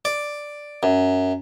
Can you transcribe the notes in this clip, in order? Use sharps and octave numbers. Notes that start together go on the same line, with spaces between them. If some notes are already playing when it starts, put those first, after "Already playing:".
D5
F#2